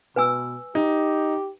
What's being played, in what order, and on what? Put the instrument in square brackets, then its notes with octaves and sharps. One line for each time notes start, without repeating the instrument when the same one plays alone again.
[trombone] B2 [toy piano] B4 G#5 E6
[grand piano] D#4 [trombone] G4